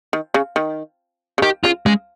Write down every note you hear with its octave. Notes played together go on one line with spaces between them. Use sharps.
D#3
C#3
D#3
C#3
D#3 G4
C#3 F4
C#3 G#3